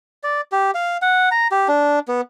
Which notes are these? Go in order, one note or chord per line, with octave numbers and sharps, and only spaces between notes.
D5
G4
F5
F#5
A#5
G4
D4
B3